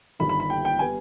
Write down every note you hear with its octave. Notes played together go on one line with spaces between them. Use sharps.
G1 G2 D#3 B5
B5
B5
G5
G5
G3 B3 G#5